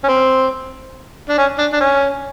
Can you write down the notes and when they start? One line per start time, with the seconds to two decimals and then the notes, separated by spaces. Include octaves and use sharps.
0.04 C#4
0.08 C4
1.29 D4
1.38 C#4
1.58 D4
1.73 D4
1.81 C#4